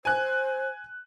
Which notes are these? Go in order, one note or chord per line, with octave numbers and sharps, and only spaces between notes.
C5 G#5 F#6